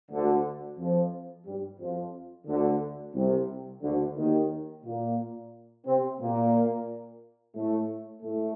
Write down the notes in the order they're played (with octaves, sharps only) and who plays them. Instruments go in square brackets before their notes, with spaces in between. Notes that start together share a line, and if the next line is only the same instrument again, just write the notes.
[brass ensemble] D2 D3
F2 F3
G2 G3
F2 F3
D2 D3
C2 C3
D2 D3
D#2 D#3
A#2 A#3
C3 C4
A#2 A#3
A2 A3
A2 A3